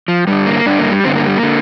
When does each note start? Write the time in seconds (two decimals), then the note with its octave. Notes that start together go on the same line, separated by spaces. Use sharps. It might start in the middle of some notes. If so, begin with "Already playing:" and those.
0.08 F3
0.27 G2 D3 G3
0.46 A#3
0.66 G2 D3 D4
0.79 A#3
0.91 G3
1.04 G2 D3 C4
1.15 A#3
1.26 G3
1.37 A#3
1.43 D3